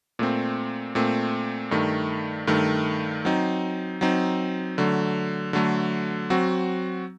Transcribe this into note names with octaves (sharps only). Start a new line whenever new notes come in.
A#2 A3 C4
A#2 A3 C4
G2 D#3 A3
G2 D#3 A3
F#3 C4 D#4
F#3 C4 D#4
D3 F#3 A3
D3 F#3 A3
F#3 C4 F#4